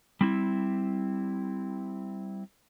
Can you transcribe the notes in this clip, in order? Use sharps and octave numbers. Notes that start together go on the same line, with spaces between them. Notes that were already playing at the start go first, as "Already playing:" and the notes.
G3 C4 E4